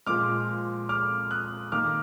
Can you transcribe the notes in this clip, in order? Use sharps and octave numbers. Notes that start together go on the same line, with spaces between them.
A#2 F3 G#3 D6 F6
D6 F6
D#6 F#6
D#3 A#3 D6 F6